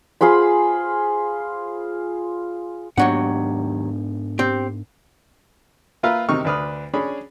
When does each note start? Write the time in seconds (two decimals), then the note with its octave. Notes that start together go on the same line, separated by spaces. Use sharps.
0.21 F4 G#4 C5 B5
2.97 D#2 G#2 F#3 B3 D4 F#5
4.39 C4 G4
6.03 A#3 F4 B4 E5 F5 A#5
6.29 C3 D#3 D#4 C#6 F6
6.45 D2 D4 B4 D#6 F6
6.93 C#4 D4 G#4 B5